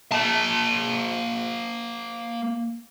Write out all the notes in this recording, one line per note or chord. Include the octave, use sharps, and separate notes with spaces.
A#3 A5